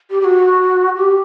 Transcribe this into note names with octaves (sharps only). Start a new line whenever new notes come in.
G4
G4
F#4
G4